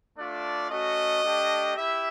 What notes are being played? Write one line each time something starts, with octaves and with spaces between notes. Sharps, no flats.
A3 D4 F4 D5
A3 C#4 F#4 D#5
A3 D4 G4
E4 G4 E5